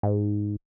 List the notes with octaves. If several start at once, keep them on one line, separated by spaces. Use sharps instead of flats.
G#2